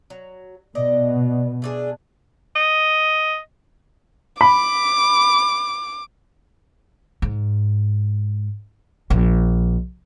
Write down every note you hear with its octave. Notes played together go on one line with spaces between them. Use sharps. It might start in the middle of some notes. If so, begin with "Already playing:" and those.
F#3
B2 D5 D#5
A3 D4 G#4
D#5
B5 D6
G#2
A#1